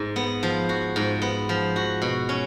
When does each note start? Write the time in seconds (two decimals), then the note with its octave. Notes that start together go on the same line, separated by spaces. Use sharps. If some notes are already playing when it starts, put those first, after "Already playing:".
Already playing: G#2
0.16 B3
0.43 F3
0.69 F#4
0.96 G#2
1.22 B3
1.49 F3
1.76 F#4
2.02 B2
2.29 C#4